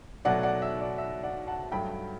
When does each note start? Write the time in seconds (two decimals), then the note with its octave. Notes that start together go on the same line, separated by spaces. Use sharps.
0.25 B2 F#3 A3 D5 F#5
0.43 D5 F#5
0.62 E5
0.81 D5
0.98 E5
1.23 D5 F#5
1.47 F#5 A5
1.72 G2 F#3 A3 G5 B5